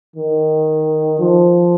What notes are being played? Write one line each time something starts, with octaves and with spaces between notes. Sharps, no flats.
D#3
F3